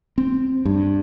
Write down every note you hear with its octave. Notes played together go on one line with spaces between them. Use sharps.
C4
G2